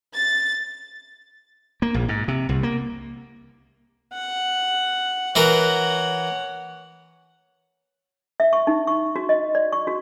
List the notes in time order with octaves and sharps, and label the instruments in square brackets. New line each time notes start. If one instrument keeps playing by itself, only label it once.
[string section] A6
[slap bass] A#3
A#1
G#2
C3
C2
A#3
[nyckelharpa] F#5
[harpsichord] E3 F#4 A#4 [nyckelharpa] C#5 F#5
[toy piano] E5
C#6
D#4
C#6
F#4
D#5
D5
C#6
F#4